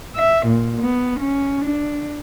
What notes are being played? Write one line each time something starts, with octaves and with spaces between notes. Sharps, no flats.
E5
A#2
B3
C#4
D4